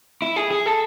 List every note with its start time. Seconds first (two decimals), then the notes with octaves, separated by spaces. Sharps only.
0.22 E4
0.36 G#4
0.51 G#4
0.66 A4